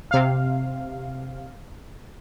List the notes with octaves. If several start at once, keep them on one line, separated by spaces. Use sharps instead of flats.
C3 F5